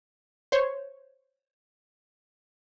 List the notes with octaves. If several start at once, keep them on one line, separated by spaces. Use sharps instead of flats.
C5 C#5